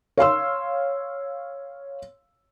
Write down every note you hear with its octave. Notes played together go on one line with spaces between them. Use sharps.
C#5 F5 C6 E6